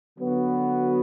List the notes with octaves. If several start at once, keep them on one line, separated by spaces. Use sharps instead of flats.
D3 F#3 B3 F#4